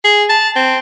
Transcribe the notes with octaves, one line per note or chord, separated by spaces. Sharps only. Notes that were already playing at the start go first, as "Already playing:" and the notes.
G#4
A5
C4